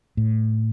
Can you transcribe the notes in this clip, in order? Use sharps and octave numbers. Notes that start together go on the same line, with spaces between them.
A2